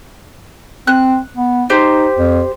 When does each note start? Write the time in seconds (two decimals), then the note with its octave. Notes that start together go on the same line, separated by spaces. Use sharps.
0.87 C4 F#6
1.37 B3
1.70 D#4 G4 C5
2.18 F2